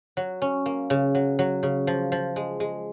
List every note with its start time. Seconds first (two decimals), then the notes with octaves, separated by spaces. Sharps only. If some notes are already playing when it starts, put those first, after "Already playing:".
0.17 F#3
0.42 C#4
0.66 A#3
0.90 C#3
1.15 F#3
1.39 F#3
1.63 C#3
1.87 F3
2.12 F3
2.36 G#3
2.60 G#3